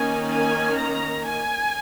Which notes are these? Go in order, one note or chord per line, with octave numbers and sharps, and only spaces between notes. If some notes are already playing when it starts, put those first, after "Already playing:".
Already playing: D#3 A#3 C#4 G#5
G#5
A#5
G#5